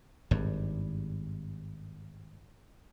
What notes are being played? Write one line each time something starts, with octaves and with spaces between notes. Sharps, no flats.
G#1 G2